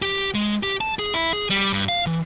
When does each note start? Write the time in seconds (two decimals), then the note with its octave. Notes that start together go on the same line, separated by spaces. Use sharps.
0.02 G4
0.34 G#3
0.63 G4
0.81 A5
0.99 G#4
1.14 E4
1.33 G#4
1.50 G3
1.73 G2
1.88 F5
2.06 E3